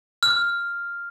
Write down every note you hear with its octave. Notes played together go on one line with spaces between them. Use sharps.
F6